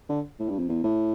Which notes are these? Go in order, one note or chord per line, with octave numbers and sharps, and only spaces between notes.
D3
A2
G2
F2
E2
A2